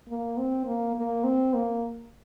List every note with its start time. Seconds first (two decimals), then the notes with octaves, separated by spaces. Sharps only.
0.09 A#3
0.38 C4
0.66 A#3
0.96 A#3
1.24 C4
1.54 A#3